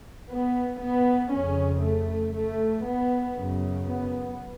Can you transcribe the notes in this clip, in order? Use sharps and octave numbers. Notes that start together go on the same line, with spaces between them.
B3
B3
F2 C#3 C#4
A3
A3
B3
F#2 C#3
B3